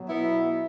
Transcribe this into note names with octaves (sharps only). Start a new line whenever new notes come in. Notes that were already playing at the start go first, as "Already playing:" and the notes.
Already playing: B2 F#3
B3 E4